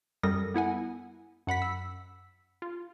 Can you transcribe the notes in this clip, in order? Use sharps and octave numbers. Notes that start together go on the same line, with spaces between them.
F#2 G3 A4 A#4 D#6 A#6
B3 E4 F#5 G#5
F#2 F#5 B5 B6
E6
F4